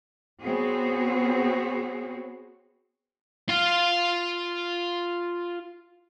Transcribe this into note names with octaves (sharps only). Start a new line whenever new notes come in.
B3 C4 F#4 G#4 C#5
F4 F5